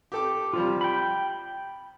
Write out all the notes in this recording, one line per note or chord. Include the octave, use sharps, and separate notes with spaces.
G4 A4 D6
C3 F3 G3 F4
G5 B5